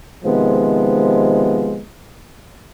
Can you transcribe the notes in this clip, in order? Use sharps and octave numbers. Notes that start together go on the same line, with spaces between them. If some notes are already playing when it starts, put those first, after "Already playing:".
C3 D#3 F3 G#3 B3